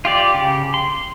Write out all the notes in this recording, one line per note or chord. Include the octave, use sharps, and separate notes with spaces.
F4 G4 D5
C#3 G4
C6